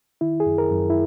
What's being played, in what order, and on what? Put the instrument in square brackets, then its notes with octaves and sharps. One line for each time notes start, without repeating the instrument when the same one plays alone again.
[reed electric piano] D#3 E4
G#4
F#2
A#4
F#2
E4